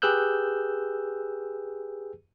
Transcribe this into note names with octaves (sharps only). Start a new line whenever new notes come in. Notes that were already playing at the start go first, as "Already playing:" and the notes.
G4 G#4 B4 E6 F#6 G6